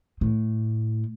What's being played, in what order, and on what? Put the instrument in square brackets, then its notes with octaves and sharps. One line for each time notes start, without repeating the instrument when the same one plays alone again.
[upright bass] A2